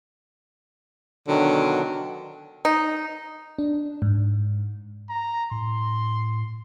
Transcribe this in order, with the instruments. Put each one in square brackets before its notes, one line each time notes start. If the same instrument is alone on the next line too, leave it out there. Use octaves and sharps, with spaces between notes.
[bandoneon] B2 D#3 F#3 [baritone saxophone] D3
[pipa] D#4
[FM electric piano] D4
G#2
[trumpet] A#5
[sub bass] A2 [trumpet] C6